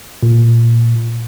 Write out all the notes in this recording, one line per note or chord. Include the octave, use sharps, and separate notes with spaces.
A#2